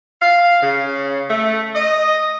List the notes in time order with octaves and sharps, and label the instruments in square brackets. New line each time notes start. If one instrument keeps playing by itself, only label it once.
[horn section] F5
C#3
A3
D#5